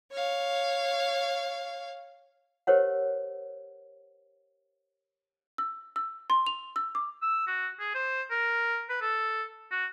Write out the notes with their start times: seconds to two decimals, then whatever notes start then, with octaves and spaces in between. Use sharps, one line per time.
0.12 C#5 F5
2.67 G4 A#4 C5 C#5 D#5 F#5
5.58 E6
5.96 E6
6.30 C6
6.47 F7
6.76 E6
6.95 D6
7.22 E6
7.47 F#4
7.80 G#4
7.95 C5
8.31 A#4
8.90 B4
9.01 A4
9.71 F#4